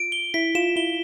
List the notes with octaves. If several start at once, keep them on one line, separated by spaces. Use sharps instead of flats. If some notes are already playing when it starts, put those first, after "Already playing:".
Already playing: F4 D7
G7
E4 B6
F4 E7
E4 G7